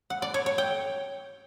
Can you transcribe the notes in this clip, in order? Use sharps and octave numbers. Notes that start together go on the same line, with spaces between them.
F#5
D5
C#5
C#5
G5